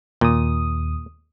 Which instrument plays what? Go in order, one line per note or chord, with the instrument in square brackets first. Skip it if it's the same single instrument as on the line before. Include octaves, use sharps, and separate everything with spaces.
[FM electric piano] D#2 D#6 [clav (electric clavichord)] A#2